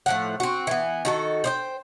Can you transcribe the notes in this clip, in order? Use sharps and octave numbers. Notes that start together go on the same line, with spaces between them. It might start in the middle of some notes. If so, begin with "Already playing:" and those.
A2 F3 F#5
C4 F#4
E3 B3
D#3 F#4 A4
C5 D5 G5